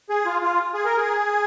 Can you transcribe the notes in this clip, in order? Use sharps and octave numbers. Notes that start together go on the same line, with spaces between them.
G#4
F4
F4
G#4
A#4
G#4